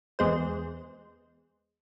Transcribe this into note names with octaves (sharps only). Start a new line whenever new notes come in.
E2 G#3 C5